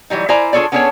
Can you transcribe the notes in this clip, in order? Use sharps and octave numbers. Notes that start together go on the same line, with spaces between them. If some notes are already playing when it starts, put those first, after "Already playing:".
E3 F#3 G3 D#4
E4 A#4 C5 D5 G#5 A#5
D4 F4 G#4 A4 C#5 D5
B3 C#4 D4 G#4 A4 C#5